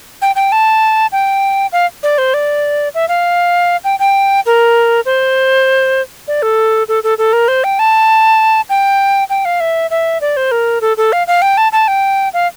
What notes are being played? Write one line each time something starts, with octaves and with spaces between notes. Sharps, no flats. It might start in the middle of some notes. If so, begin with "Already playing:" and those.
G5
G5
A5
G5
F5
D5
C5
D5
E5
F5
G5
G5
A#4
C5
D5
A4
A4
A4
A4
A#4
C5
G5
A5
G5
G5
F5
E5
E5
D5
C5
A#4
A4
A4
F5
F5
G5
A5
A5
G5
F5